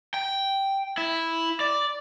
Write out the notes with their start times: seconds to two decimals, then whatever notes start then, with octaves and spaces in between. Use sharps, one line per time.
0.14 G5
0.98 E4
1.60 D5